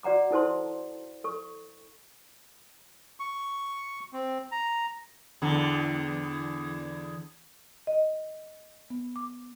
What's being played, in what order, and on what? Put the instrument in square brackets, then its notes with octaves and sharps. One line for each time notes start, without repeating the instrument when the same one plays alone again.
[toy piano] F#4 D5 F#5 A#5 D6
D#4 E4 A4 C5 A5 C6
A4 C#6
[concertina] C#6
C4
A#5
[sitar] E2 D3
[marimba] D#5
B3
D6